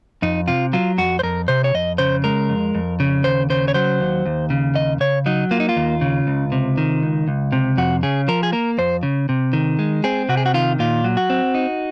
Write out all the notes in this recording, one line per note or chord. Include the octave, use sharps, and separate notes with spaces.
F2 D#4
C3 F4
F#3 F4
F2 F#4
C5
F2 A#4
C3 C5
C#5
F2 D#5
C#3 C5
G#3 A#4
F2
F2
C#3
D#2 C5
C#3 C5
C#5
F#3 C5
D#2
D#2
C#3
D#2 D#5
C#3 C#5
F#3 D#4
A#3 F4
D#4
F4
D#2
C#3
C#2
C3
D#3
C#2
C#2
C3
F2 F#4
C#3 G#4
F3 A#4
G#4
A#3 A#4
F2 C5
C#3
C3
D#3
G#3
C4 G#4
C3 F#4
G#4
F#4
D#3 F4
A#2 F4
F#3
F#4
C4
D#4